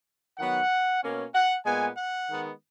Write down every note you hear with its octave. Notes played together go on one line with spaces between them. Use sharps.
D#3 F#3 B3 F#5
B2 A#3 C#4
F#5
A#2 G#3 B3 G#5
F#5
D#3 G#3 B3